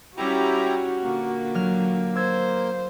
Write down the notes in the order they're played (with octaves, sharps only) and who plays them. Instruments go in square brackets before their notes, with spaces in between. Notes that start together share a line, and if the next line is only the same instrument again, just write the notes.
[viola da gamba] G3 C#4 [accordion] E4 G4 A#5 [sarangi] F#4
[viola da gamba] A#2 D3 [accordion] A#3
[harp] F#3 F6
[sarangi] C5 [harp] E6 G#6